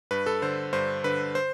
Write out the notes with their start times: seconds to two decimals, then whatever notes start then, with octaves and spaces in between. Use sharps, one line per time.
0.11 G2 B4
0.26 A4
0.42 D3 C5
0.73 G2 C5
1.04 D3 B4
1.35 C5